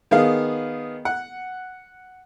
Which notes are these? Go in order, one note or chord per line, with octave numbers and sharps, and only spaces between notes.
D#3 B3 G#4 F5
F#5